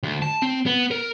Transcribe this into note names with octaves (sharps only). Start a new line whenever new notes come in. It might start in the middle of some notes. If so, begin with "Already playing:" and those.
D2
A5
C4
B3
A#4